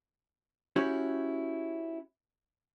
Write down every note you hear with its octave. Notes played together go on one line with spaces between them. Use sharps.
C#4 E4 F#4 G4 C#5